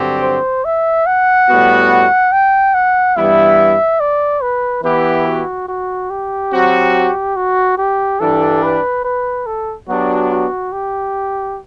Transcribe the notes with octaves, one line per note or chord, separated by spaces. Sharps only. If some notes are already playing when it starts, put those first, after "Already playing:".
Already playing: G2 D3 F#3 C4 G4
C5
E5
F#5
A2 G3 B3 F#4
G5
F#5
G2 E3 G3 B3 E4 E5
D5
B4
E3 B3 E4 G4 B4
F#4
F#4
G4
F#3 C4 F#4
F#4
G4
G2 E3 G3 D4 A4
B4
B4
A4
F#3 B3 D4 F#4 G4
F#4
G4